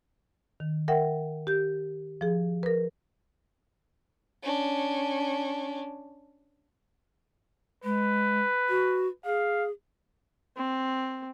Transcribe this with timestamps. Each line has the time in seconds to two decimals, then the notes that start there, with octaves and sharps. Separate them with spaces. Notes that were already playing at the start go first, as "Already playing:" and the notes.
0.60 D#3
0.88 A#4 E5 F#5 G5
1.47 G4 G6
2.21 F3 G#4
2.63 A#4 B4
4.42 C#4 D4
7.84 G#3 B4
8.69 F#4
9.25 G#4 F5
10.57 C4